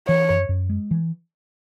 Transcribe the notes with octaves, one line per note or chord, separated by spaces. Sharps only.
E3 C#5
F#2
F#2
G#3
E3